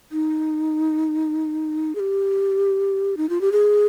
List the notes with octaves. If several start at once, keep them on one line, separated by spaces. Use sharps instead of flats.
D#4
G#4
G4
D#4
F4
G4
G#4